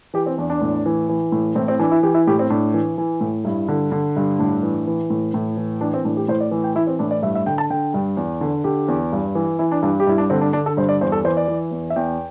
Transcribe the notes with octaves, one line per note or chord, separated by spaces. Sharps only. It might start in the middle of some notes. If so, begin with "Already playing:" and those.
E3 G4
C4
E2 D4
D4
A2
E3
E3
A2
A2 C4
C4
E3 D4
E4
E3 G4
E4
A2 G4
C4
A2 D4
E3
E3
A2
G2 E4
D3
D3
G2
A2 D4
E3
E3
A2
A2
E3
E3 D4
C4
A2 D4
G4
A2 C5
D5
E3
G5
E3 E4
C4
A2 D4
D5
G2 E5
E5
D3 G5
A5
D3 G5
G2
E2
D3
D3 G4
E2
G2
E3
E3 E4
D4
G2 D4
G4
G2 E4
D4
D3 C4
D4
D3 D4
A4
G2 C5
D5
E2 C5
A4
E3 C5
D5
E3
E2
E5
E2 G5